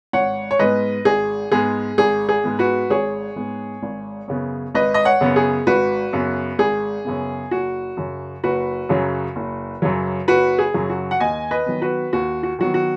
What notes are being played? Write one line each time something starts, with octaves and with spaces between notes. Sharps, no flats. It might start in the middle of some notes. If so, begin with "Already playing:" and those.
G#1 C#5 F#5
C#5
G#2 G#3 B3 B4 D#5
G#1 G#4
G#2 G#3 B3 G#4
G#1 G#4
G#4
G#2 G#3 B3
F#4 B4
G#1 G#4 C#5
G#2 G#3 B3
G#1
F#2 C#3 B3
G#1 B4 D#5
D#5
C#5 F#5
F#2 C#3 B3
G#4
G#1 F#4 B4
F#2 C#3 B3
G#1 G#4
F#2 C#3 B3
F#1 F#4
F#2 C#3 F#3
F#1 F#4 B4
F#2 C#3 F#3
F#1
F#2 C#3 F#3
F#1 F#4 B4
G#4
F#2 C#3 F#3
F#4
F#5
D#2 D#5 G#5
B4 D#5
D#3 F#3 B3
F#4 B4
D#2 F#4
F#4
D#3 F#3 B3 F#4
F#4